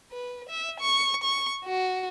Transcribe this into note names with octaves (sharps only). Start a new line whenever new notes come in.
B4
E5
C#6
C#6
F#4